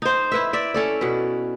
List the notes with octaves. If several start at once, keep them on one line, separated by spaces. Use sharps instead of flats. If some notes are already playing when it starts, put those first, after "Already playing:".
D#4 C5
E4 B4 E5
D5 E5
C#4 A4 D5
B2 B4